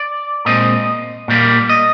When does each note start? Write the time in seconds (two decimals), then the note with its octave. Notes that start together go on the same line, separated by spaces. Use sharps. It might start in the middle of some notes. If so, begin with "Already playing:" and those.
Already playing: D5
0.46 A#2 G#3 C4 D#5
1.28 A#2 G3 A#3
1.69 D#5